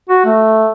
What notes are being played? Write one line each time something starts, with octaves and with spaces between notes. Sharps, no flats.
F#4
A3